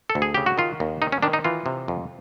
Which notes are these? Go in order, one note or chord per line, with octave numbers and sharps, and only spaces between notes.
A4
D2
G#4
C#3 G4
F#4
D#3 F4
D#2
D#3 D#4
C#4
D#3 D4
D#4
E3 F4
C3
F2